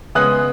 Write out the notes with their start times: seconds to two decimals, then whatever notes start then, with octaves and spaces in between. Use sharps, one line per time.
0.15 C#3 G#3 B3 D#6 F#6